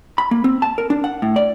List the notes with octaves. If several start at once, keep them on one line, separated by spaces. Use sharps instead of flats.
B5
A#3
C4
A5
A#4
D4
F#5
A2
D5